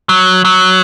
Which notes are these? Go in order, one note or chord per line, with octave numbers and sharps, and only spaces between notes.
F#3
F#3